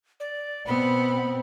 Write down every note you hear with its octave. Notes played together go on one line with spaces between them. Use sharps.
D5
B2 B3 C4 B5